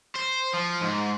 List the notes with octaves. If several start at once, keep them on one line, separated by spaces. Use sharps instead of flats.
C5
F3
G#2